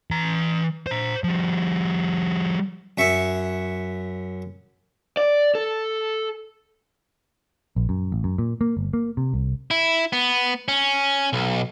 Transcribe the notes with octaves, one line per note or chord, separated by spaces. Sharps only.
E3 A#5
C5 A#5
F3 G3
F#2 E5 C#6
D5
A4
A#1
F#2
A1
F#2
A#2
A#3
G1
A#3
C3
C2
E4
B3
C#4
B1